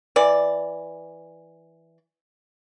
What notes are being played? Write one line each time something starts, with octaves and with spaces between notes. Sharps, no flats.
E3 D5